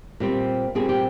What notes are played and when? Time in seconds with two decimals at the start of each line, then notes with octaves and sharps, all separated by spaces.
0.20 A#2 G3 C4
0.75 A#2 G3 C4 G#4
0.89 G4